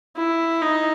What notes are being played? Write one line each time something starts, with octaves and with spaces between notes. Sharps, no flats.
E4
D#4